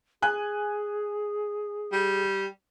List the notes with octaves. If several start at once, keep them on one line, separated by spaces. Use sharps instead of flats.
G#4 G#5 F#6
G3